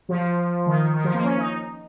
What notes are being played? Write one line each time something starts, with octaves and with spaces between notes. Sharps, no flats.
F3
D#3
D#3
F3
A#3
C#4
D#4